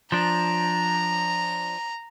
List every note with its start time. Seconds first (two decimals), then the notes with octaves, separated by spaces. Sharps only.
0.12 F3 D4 A#5